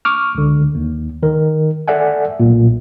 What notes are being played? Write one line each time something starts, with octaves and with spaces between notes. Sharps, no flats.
C#6 D6 F6
C#2 D3
D#2
D#3 A#4
A4 D5 E5 F#5 G#5
B1 A#2